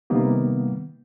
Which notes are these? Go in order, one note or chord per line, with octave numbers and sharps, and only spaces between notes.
C3 D#3 G3 A#3 B3